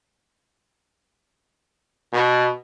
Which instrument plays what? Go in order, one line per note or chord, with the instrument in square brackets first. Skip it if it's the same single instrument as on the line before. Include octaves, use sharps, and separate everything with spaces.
[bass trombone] B2